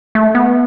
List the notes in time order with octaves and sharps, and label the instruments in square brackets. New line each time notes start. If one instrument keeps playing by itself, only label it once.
[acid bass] A3
B3